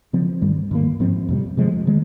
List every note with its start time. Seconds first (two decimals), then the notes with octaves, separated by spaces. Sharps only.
0.13 C#3 F3 C4
0.42 G2 D#3 G3
0.71 G2 D#3 A#3
1.00 G#2 F3 C4
1.29 F2 C3 G3
1.57 C3 F3 G#3
1.87 D#3 G#3